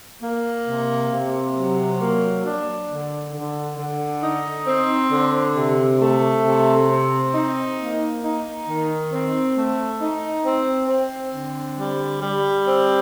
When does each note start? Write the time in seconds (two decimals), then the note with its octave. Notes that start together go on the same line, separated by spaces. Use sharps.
0.21 A#3
0.66 C3
1.10 C3
1.55 F#3
1.99 A#3
2.44 D4
2.88 D3
3.32 D3
3.77 D3
4.22 D#4
4.66 C4
5.10 D3
5.55 C3
5.99 A3
6.44 C3
6.88 C4
7.33 D#4
7.77 A#3
8.22 D#4
8.66 D#3
9.11 C4
9.55 A3
9.99 D#4
10.44 C4
10.88 C4
11.33 D3
11.77 G3
12.21 G3
12.66 C4